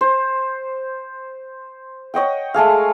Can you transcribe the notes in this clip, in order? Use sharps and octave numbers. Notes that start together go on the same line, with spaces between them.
C5
C#5 D#5 F#5 G5
G#3 A3 G#4 F5